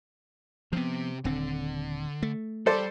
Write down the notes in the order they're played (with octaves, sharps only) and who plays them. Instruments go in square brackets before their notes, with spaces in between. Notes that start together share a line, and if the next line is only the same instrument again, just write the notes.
[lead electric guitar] C3 C4 [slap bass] F3 B3
[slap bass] D#1 C4 [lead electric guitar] D3
[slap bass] A3
[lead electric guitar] G3 [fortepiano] A4 C5 D5